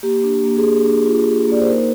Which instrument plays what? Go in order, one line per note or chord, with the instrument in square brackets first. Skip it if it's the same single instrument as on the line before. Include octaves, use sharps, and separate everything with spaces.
[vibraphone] A#3 G4
D4
A#3
G#4
A#3
D4
F4
D4
A#3 D5
C5
D#4 A#4